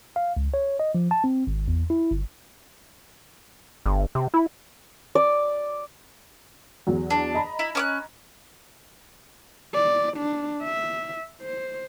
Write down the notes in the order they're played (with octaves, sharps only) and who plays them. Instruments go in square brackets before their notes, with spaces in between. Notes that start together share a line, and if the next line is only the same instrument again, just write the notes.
[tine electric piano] F5
C#2
C#5
D#5
F3
A5
C4
G#1
E2
E4
G1
[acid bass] G1
C3
E4
[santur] D5
[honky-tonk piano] E2 F#3
[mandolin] D4
[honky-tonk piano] D#5 A#5 B5
[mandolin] E4
C#4 D6 F#6
[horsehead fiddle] D5
D4
E5
C5